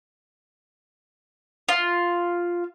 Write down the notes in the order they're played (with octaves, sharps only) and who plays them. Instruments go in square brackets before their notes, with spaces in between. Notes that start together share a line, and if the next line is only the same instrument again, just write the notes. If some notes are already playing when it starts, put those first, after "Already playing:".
[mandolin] F4